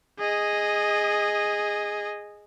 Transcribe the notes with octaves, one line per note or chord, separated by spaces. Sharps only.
G#4 D#5